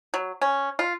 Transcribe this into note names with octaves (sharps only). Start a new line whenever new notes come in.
F#3
C#4
F4